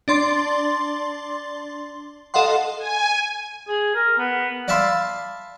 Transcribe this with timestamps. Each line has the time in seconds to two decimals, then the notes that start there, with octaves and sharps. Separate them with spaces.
0.08 D4 D5 C6 A6
2.34 A4 D#5 F5 F#5 C6
2.78 G#5
3.69 G#4
3.95 A#4
4.18 B3
4.68 D5 E5 F5 A5 B5 C6